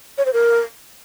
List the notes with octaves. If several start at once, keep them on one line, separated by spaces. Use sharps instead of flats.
C#5
C5
A#4